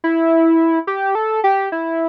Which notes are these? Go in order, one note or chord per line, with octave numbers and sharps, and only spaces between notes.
E4
G4
A4
G4
E4